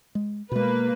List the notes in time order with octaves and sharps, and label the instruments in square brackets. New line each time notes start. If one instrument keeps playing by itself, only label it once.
[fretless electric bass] G#3
[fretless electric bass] B2 G#3 [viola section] A#3 B4